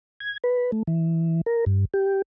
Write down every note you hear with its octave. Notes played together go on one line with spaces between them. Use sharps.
G#6
B4
A3
E3
A#4
G2
G4